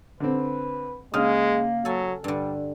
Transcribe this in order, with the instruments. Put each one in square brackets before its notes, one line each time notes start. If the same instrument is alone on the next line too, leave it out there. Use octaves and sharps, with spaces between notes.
[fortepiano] D3 C4 [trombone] B4
[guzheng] C#3 [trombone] G#3 [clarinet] A#3 [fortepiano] D#6 F6
[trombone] F#3 [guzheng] A4 G#5
[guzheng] G2 D3 [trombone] G3